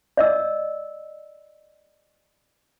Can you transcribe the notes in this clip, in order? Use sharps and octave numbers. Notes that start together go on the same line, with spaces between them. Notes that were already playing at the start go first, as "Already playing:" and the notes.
D5 D#5 E6